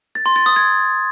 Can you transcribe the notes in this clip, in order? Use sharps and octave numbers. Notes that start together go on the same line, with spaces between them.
A6
C6
A6
D#6
G#6